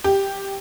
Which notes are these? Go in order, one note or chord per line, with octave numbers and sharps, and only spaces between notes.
G4